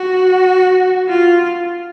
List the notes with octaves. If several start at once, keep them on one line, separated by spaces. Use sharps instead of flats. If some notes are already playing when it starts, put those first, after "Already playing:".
Already playing: F#4
F4